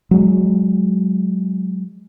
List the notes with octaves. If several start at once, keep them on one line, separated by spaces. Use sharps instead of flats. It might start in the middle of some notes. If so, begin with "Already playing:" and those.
F#3 G#3